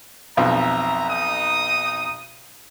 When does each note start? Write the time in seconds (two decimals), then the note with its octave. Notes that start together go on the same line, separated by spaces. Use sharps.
0.37 B1 F2 E5 A#5
1.11 D#4 D#6